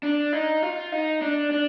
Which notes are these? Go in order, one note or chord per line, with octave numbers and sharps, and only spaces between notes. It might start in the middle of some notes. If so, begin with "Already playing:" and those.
D4
D#4
F4
D#4
D4
D4